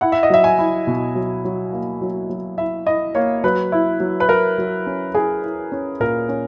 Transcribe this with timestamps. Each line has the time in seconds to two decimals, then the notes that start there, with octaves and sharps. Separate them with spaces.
0.01 E4 F#5
0.12 E5
0.23 D#5
0.30 F#3 E5
0.44 G#5
0.58 E4
0.87 B2
1.15 F#3
1.45 F#3
1.73 A#3
2.01 F#3
2.30 F#3
2.58 E4 E5
2.86 E4 D#5
3.15 A#3 C#5
3.44 F#3 B4
3.72 E4
4.00 F#3
4.20 B4
4.29 F#3 A#4
4.58 F#3
4.86 C#4
5.14 E4 G#4
5.43 E4
5.72 C#4
6.00 A#2 A#4
6.29 C#4